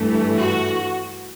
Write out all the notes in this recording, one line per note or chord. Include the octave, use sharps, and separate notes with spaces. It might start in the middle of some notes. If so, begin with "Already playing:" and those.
Already playing: G2 E3 A3
F#4